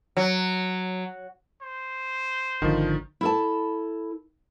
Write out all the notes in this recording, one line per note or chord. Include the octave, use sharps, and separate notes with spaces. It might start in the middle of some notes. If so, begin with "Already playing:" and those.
F#3
C5
G#1 D3 D#3 F3
E4 A4 A5